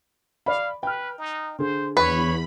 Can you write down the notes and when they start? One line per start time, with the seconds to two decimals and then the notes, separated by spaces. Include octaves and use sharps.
0.46 D5 F5 B5
0.83 B4 G5 F6
1.18 D#4
1.59 D3 G#4 C5
1.97 E2 B4 C#5 B5